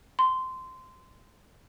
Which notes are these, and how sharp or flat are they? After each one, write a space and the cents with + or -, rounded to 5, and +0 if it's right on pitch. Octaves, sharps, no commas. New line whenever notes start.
C6 -15